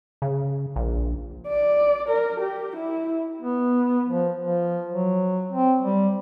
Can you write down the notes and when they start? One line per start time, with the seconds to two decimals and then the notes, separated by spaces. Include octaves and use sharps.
0.22 C#3
0.76 A#1
1.47 D5
2.09 A#4
2.40 G4
2.76 E4
3.42 B3
4.07 F3
4.40 F3
4.91 F#3
5.52 C4
5.82 G3